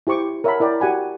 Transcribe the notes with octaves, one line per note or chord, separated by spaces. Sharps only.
E4 G4 C5 C#6 D6
A#4 C#5 E5 F#5 A5 B5
E4 A#4 D5 G5
F#4 G4 F#5 G#5 B5